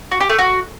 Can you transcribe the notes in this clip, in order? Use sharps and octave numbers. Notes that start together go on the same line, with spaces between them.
F#4
G4
A3
F#4